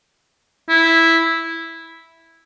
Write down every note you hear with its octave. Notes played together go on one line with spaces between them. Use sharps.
E4